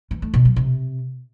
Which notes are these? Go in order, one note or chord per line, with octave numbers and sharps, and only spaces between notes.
E3
A3
B2
F#3
C3